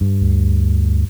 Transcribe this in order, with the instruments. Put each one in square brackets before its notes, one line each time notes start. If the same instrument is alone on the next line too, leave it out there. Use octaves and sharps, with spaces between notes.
[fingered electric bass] G2
[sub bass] D2